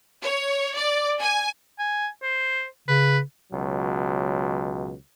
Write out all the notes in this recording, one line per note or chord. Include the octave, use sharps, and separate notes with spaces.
C#5
D5
G#5
G#5
C5
C#3 B4
C#2 B2 F#3